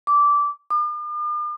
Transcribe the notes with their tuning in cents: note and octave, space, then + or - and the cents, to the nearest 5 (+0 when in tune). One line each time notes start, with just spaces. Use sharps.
D6 -15
D6 +45